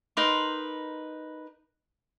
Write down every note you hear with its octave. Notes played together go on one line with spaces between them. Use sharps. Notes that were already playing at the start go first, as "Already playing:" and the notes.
D#4 A#4 B4 C6